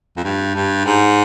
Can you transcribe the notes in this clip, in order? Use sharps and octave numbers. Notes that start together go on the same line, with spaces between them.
F2
G2
G2
G#2